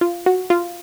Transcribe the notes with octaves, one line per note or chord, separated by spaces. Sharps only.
F4
F#4
F4